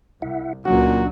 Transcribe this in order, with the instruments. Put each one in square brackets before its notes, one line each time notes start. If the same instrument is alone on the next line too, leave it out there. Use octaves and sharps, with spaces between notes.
[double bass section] C2 [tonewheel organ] E4 E5 F#5
[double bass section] C#2 F#3 [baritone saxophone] A#2 [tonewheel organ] C#4 D4 [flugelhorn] F#4